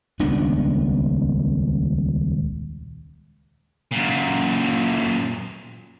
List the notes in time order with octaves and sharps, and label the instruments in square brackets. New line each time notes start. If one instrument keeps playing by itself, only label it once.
[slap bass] D#1 C#2 B3 D4
[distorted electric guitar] F#2 A#2